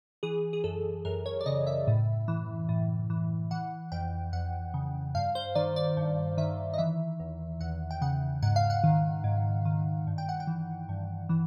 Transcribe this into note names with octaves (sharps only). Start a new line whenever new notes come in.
E3 G#4
G#4
F#2 A4
F#2 A#4
C#5
D5
C#3 D#5
E5
A2
E3
A2
E3
E3 F#5
F2 G5
F2 F#5
C#3
G2 F5
C5
D#3 D5
D5
G2
D#3 E5
D#5
E3 E5
E2
E2 F#5
G5
C#3 F#5
G#2 F#5
F5
F#5
D#3
G#2
D#3
G2
G5
F#5
G5
E3
G2
E3